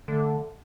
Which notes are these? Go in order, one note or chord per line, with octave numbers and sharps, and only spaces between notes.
D3 A3